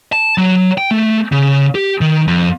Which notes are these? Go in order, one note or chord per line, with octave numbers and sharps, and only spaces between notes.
A5
F#3
G5
A3
C#3
G4
D#3
F2